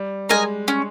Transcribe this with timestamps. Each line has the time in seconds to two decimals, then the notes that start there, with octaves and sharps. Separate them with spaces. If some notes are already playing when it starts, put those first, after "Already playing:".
Already playing: G3
0.29 G#3 A#4 D#5 G#5
0.68 C#4